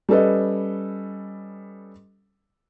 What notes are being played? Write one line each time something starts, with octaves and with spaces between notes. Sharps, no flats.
G3 C#4 A4 B4 D#5